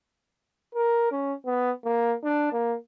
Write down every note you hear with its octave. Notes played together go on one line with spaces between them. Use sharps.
A#4
C#4
B3
A#3
D4
A#3